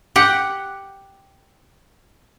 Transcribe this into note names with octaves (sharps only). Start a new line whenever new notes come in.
G4 F#5